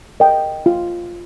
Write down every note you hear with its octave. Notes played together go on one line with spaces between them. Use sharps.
A#4 D#5 G5
F4